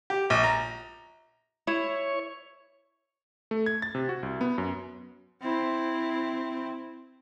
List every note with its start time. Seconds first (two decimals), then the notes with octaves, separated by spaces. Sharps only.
0.10 G4
0.30 A#1
0.44 A#5
1.67 E4 C#5
3.51 A3
3.66 G#6
3.82 A6
3.95 C3
4.09 F#4
4.23 C2
4.41 B3
4.58 F#2
5.41 C4 E4